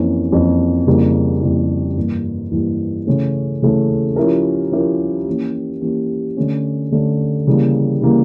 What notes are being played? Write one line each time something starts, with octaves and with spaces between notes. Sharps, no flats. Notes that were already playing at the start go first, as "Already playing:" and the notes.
Already playing: F2 E3 A#3 C#4
F2 E3 A#3 C#4
F2 C#3 G3 A#3 E4
F2 C#3 G3 A#3 E4
G2 E3 A#3
G2 E3 A#3
C#3 E3 A3 C#4
C#3 E3 A3 C#4
F3 C#4 E4 G4 A#4
F3 C#4 E4 G4 A#4
E3 A#3 C#4 G4
E3 A#3 C#4 G4
D3 A3 C#4
D3 A3 C#4
C#3 E3 G3 A#3
C#3 E3 G3 A#3